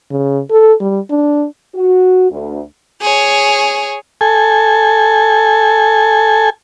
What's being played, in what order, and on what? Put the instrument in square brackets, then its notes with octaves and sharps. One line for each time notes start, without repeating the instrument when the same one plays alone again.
[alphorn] C#3
A4
G3
D4
[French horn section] F#4
D2
[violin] G#4 C#5
[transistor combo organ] A4 G#5